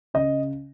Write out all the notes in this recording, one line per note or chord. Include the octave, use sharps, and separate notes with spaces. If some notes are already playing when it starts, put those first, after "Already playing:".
C#3 D#5